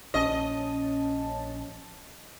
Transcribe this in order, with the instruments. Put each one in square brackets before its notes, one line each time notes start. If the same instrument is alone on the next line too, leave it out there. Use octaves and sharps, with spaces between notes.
[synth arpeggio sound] A#1 C#4 A5 [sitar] D#5